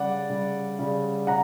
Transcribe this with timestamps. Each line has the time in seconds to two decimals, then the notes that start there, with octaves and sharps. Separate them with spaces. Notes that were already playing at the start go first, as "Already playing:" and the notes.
Already playing: C#3 G3 D5 F#5
0.30 C#3 G3
0.79 C#3 G3
1.27 C#3 F#5 A#5